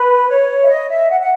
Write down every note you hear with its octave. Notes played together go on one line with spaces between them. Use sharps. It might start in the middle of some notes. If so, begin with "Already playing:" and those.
Already playing: B4
C#5
E5
D#5
E5
F#5
F#5